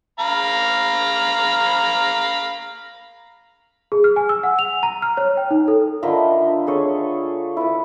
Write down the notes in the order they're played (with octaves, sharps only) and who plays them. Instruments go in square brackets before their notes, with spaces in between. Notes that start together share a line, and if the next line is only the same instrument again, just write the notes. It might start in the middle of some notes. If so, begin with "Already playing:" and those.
[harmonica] F5 A#5 B5
[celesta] G#4
F6
G#5
E6
F#5
F7
A#5
F6
C#5
G5
D#4
A4
[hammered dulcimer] D3 D#5 E5 [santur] F4 A#4 B4
[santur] G#4 A4 C#5
E4 B4